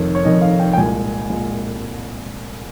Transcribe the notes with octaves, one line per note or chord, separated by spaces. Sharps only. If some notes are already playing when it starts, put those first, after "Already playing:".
Already playing: F1 F2 D#3 C#5
C#5
F1 F2 D#3 D#5
F5
G5
G5
C2 A#2 G#3 G#5
A#2 G#3